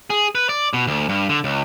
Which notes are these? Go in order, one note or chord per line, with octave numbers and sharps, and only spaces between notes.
G#4
B4
D5
B2
D2
G2
D3
C#2